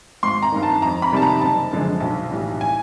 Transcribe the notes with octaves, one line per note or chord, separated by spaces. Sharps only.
G#1 C6
A#5
G2 D#3
A5
F2 A#5
B5
C3 D#3 G3 A5
A#5
F#1 A5
F#2 D3 F3 G#3
B1
A2 E3 G3
G#5